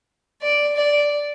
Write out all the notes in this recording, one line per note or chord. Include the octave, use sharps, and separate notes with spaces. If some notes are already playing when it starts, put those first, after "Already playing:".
D5
D5